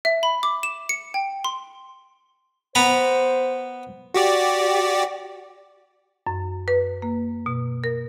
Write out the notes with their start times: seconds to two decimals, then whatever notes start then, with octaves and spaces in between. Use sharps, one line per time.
0.05 E5
0.23 B5
0.43 D6
0.63 E7
0.89 C#7
1.14 G5
1.44 C6
2.75 B3 C5 A#5 B5
4.14 F#4 G4 D5
6.27 F#2
6.68 B4
7.02 A#3
7.46 B2
7.84 A#4